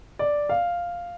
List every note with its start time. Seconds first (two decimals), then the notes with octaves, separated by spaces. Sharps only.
0.19 D5
0.49 F5